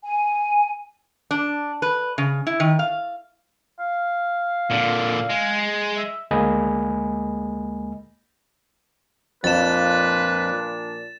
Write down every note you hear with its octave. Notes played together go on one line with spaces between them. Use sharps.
G#5
D4
B4
C#3
E4
D#3
F5
F5
A#2 D3
G#3
E5
D2 G#3 A#3 D#5 G#5 B5
F2 A#2 F3 D4 B4 A6 E7